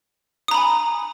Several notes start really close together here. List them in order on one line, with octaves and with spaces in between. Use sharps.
D#6 A#5 B5 G#5